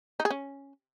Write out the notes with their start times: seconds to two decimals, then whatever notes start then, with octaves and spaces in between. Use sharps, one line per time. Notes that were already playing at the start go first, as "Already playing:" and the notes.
0.20 D#4
0.25 G#4
0.31 C#4